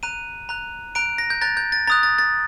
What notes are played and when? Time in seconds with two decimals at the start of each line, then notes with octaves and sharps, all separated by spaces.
0.03 A#5 F#6 D#7
0.49 A#5 F#6
0.95 A#5 F#6 D7
1.18 A#6
1.30 G6
1.41 A#5 F#6 A6
1.57 G6
1.72 A6
1.87 A#5 D#6 F#6 A6
2.03 A6
2.18 A6